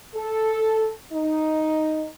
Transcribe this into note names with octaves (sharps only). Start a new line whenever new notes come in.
A4
D#4